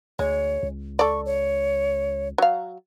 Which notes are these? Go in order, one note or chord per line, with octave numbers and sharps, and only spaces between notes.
D2 G#3 C#5
C#2
A4 D5 C#6
C#5
F#3 F5